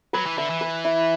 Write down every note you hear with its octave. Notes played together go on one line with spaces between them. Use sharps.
F#3 B4
E3
D3 E5
E3
B4
E4